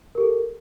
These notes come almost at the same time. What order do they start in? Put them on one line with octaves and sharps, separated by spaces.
A#4 G4 A4